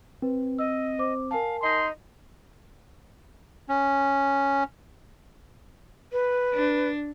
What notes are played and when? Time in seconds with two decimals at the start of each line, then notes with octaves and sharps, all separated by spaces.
0.22 C4 B4
0.59 D#5 E6
0.99 C5 D6
1.31 A#4 F5 G#5 A5
1.62 D#4 D#5 C6
3.69 C#4
6.12 B4
6.54 D4